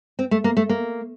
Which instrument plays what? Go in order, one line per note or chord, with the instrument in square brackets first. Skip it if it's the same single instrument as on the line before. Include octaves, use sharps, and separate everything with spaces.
[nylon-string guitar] C4
A3
A#3
A3
A#3